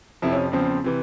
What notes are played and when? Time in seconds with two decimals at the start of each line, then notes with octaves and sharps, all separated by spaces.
0.22 F2 C3 F3 E4
0.32 C#4
0.52 E2 C#3 F3 C4
0.84 C3 E3